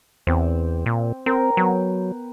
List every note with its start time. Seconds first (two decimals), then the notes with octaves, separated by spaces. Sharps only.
0.27 E2 C4 D6
0.86 A#2
1.26 C4 A#4 G5 A#5
1.57 F#3 B3